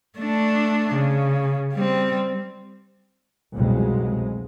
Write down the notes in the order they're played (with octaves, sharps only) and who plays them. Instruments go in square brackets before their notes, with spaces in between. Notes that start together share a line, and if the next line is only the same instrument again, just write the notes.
[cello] A3 D4
C#3
G3 C4
[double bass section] F1 C2 F2 B2 F#3 G#3